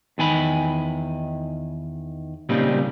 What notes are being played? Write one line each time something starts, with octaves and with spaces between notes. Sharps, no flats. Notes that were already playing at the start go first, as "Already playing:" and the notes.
E2 D#3 G#5 B5
A#2 C#3 G3 C4 D#4